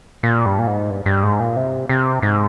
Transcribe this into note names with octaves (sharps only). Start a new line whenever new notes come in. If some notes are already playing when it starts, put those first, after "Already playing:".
A#2
G2
A#2
G#2
G2
G2
G#2
A#2
C3
C3
G#2